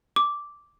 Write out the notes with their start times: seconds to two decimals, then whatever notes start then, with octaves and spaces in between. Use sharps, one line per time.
0.16 D6